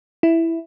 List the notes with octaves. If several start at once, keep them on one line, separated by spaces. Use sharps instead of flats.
E4